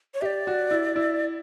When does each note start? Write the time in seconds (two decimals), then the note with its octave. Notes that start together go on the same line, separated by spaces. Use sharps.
0.14 C#5
0.22 G4 D5 E5
0.47 F#4
0.71 E4
0.96 E4